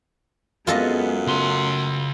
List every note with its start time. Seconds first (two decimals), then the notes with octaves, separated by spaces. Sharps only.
0.67 F#2 G#3 B3 F4 G#4 A4 D#5
1.27 C#3 A3 C6